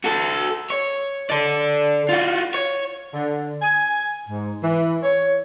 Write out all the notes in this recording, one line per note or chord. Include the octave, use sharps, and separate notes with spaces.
F#4 A4
C#5
A4 D5
F4 F#4
C#5
D3
G#5
G#2
E3
C#5